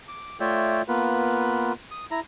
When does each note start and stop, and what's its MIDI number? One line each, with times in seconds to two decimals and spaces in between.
0.08 0.38 86
0.40 0.82 57
0.40 0.82 65
0.40 0.82 73
0.40 0.82 74
0.40 0.82 76
0.40 0.82 79
0.88 1.73 58
0.88 1.73 59
0.88 1.73 65
0.88 1.73 71
1.91 2.06 87
2.11 2.20 64
2.11 2.20 82